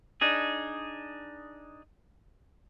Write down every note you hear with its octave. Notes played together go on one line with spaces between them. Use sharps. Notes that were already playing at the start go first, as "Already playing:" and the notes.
D4 D#4 G#4